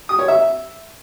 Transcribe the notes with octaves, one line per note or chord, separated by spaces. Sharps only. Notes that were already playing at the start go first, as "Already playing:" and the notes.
D#6
C#5
E5